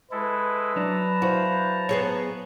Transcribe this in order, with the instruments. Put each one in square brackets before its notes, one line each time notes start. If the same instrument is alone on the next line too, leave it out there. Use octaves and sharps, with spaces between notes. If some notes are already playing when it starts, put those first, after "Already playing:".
[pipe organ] G#3 E4 A4 [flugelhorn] B4
[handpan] F#3 D4 D5 [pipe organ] A5 A#5
[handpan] E4 C5 F5 [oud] F#4
[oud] B3 G#4 C#5